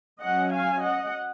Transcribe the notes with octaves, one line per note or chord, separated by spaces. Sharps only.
F#3 C#4 D#5 F#5
F5 G#5
D#5 F#5